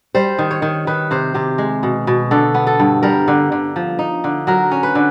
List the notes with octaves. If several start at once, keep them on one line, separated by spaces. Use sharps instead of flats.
G3 C5
D#3
C#5
D#3
D#3 B4
C3 C5
C3 G4
G#3
B2
B2
D3 A4
B3
A4
G2
G3 A#4
D3
D3
F3
D#4
D3
F#3 A#4
C#4
B4
D3